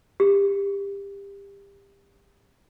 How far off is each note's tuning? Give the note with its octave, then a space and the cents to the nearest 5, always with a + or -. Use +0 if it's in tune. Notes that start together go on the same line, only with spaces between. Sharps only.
G4 +25